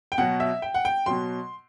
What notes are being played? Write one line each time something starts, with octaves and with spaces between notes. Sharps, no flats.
G5
B2 F#3 F#5
E5
G5
F#5
G5
B2 F#3 C6